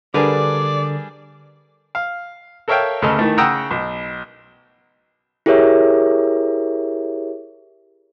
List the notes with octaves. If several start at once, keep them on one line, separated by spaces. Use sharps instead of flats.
D3 G3 D4 G#4 A#4 B4 D5
F5
A4 A#4 C#5 E5 F5 G5
D2 C#3 A4 A#4 D#5
D#3 E3 A3
C#3 F#5 G5 A#5 D#6 E6
B1
E4 G4 G#4 A#4 C#5 E5